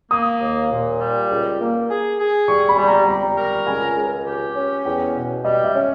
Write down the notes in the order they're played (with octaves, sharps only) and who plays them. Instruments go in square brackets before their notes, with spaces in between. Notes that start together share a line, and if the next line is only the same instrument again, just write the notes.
[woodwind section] A#3 [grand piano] D#6
[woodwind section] D#2
A#2
G3
C#2
A#3
G#4
G#4
[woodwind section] G3 [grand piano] C#6
[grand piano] B5
[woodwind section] G3
[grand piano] A#5
[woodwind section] G3 [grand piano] A#5
[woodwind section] A#4
[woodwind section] C#2 [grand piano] G#5
[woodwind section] C#2
G4
C#4
[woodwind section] E2 [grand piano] G5
[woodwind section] B2
[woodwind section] G3 [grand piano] D#5
[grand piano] E5
[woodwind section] C#4